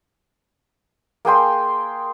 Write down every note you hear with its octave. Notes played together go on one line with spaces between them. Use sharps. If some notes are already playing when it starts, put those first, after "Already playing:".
A#3 G#4 G5 C6